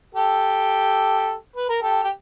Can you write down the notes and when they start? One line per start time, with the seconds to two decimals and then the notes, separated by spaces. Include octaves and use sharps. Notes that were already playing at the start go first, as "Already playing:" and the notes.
0.15 G4 A4
1.56 B4
1.69 A#4
1.82 G4 A4
2.04 G4